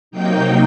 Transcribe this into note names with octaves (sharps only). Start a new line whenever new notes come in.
C3 F#3 A#3 D#4 G5 G6